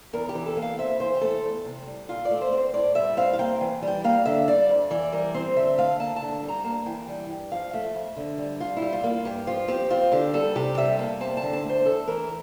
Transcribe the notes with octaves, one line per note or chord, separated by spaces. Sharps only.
E2 A#4
G4
E3
A4
A#3
F5
C4 E5
E3 C5
G4
A3 A4
E2
C3
G3
A#2 F4
D5
A3
C5
C4
C5
A2 D5
G3 E5
C4 F5
F5
A#3 G5
E3
G3
G5
A#3 F5
D3 E5
G3 D5
F2
E3 D5
G3 A#4
C4 C5
D3 E5
A3 F5
A#3 A5
A5
D3
A5
G3
A#5
A#3 A5
E3 G5
G3 G5
G2
F3 F5
A3 E5
F2
D3
G3
A2 F4
E4
G3
F4
A#3
G2 G4
F3 F4
C4 G4
C4 F4
D3 G4
G3 A4
C3 G4
G3 E5
A#3 A5
C4 A5
A5
D3
A5
A3
C5
E2 A4
E3 A#4